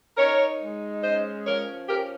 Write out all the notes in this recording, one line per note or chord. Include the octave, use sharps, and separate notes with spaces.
D#4 A#4 C#5
G#3
C#4 C5 D#5
F3 A#4 C#5
C#4 G4 A#4